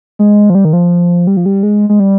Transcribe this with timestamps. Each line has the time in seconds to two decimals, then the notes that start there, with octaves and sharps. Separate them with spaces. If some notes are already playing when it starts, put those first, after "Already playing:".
0.19 G#3
0.50 F3
0.55 G3
0.65 D#3
0.73 F3
1.27 G3
1.37 F3
1.46 G3
1.63 G#3
1.89 G#3
2.00 G3